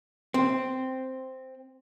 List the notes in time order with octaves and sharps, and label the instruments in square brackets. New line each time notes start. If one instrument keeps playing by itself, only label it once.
[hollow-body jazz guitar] C4